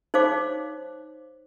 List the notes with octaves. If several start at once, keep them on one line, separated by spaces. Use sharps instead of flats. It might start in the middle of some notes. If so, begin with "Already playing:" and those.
D#4 C5 C#5 F5 D6